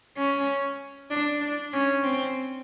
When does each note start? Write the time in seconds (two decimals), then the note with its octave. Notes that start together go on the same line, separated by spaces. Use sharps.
0.17 C#4
1.10 D4
1.41 D4
1.73 C#4
2.03 C4